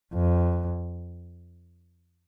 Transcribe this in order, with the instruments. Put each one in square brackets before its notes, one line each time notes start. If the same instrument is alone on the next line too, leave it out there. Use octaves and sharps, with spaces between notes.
[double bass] F2